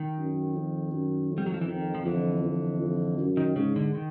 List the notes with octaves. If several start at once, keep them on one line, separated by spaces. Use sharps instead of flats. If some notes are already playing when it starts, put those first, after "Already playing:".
Already playing: D#3
F#2
F2
F#2
F2
G3
F#3
F3
E3
F2 D#3
F3
F2 D3 E3
F2
F2
F#2
D#3
G#2 C#3
D3
D#3